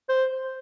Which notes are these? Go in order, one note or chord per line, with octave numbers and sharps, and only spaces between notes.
C5